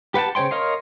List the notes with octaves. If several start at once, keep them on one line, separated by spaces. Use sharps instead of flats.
G4 B4 F#5 G5 A5
C#3 C5 C#5 G5 C6
A#4 C#5 D#5 F5 C6